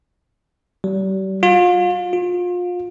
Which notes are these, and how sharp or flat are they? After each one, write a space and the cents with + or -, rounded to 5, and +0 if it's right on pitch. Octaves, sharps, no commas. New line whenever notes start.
G3 -40
F4 +35
F4 +30